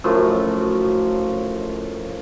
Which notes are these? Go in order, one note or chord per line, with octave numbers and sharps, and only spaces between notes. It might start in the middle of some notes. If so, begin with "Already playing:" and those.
F#2 A2 F3